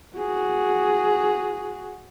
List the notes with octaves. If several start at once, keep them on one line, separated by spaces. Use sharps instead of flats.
F#4 G#4